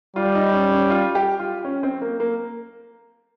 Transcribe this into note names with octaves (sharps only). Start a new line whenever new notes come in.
G3 F4
D#4
C#4
C#4
F4
G4
F4
C#4
C4
A#3
A#3